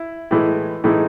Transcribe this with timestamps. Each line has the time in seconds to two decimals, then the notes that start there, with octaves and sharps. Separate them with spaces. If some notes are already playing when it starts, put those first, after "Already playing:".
Already playing: E4
0.31 A2 E3 G#3
0.84 A2 E3 G#3 D#4